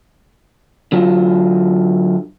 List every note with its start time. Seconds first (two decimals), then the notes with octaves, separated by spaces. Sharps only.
0.92 D3 F#3 F4